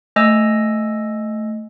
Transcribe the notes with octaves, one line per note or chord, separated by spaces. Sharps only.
A3 D#5 G#5 E6